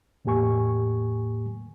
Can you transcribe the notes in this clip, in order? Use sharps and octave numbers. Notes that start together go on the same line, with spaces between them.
E2 A2 A#3 G4 G#5 C#6